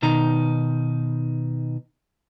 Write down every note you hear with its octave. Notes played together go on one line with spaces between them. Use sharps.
B2 D#3 D#4 A#5